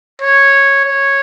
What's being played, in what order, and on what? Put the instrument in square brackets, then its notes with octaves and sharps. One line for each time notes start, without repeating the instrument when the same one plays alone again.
[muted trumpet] C#5
C#5